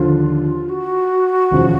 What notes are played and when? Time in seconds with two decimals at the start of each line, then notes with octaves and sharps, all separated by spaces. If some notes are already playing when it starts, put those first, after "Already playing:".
Already playing: D#2 D3 F3 F4
0.69 F#4
1.51 E1 D#2 C#3 F3